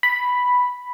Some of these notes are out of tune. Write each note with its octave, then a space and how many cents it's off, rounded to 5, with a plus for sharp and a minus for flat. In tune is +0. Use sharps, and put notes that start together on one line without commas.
B5 +0